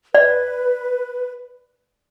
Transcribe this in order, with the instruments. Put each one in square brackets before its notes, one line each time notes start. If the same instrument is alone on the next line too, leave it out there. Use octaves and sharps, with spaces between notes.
[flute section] B4 [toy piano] D5